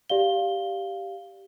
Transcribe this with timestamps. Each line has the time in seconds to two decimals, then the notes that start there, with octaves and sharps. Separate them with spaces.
0.09 G4 D5 F5 G7